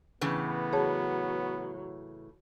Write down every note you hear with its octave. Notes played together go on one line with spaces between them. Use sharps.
A2 C#3 E3 B3
F#3 G#4 C#5 A5